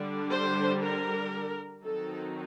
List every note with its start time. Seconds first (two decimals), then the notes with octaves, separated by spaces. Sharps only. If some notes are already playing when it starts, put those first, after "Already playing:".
Already playing: D3 G3 D4
0.30 C5
0.81 A#4
1.84 D#3 F#3 C4 D#4 A4